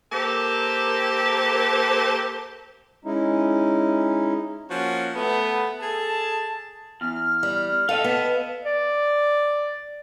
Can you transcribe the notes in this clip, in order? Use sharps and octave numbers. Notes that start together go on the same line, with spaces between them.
A#3 G4 A4 A#4 C5
G#3 C#4 D#4 E4
F3 A#3 C#4 F#4
A3 B3
G#4 A4 A5
E2 F6
G3
A4 D#5 F5
B3 A5
D5